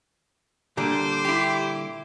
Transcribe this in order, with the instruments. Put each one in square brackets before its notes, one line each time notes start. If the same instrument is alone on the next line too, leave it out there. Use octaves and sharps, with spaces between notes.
[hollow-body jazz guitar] A#2 D3 G3 [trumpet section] C5 [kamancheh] D6
[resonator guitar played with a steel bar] E4 G4